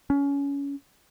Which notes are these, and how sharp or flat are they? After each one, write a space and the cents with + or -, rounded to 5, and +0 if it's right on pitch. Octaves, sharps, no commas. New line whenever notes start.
C#4 +25